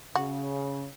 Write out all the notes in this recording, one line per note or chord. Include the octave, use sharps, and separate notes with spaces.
C#3 F#4